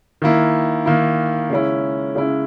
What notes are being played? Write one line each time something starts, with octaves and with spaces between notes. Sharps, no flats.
D#3 A#3 E4
D#3 A#3 E4
C#3 G#3 C#4 E4
C#3 G#3 C#4 E4